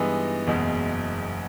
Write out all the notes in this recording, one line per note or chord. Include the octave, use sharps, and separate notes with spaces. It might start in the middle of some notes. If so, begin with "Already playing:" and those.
Already playing: G2 E3 G#3 B3 D#4
F#1 E2 B2 G#3